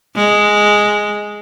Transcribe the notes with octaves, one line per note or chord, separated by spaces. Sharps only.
G#3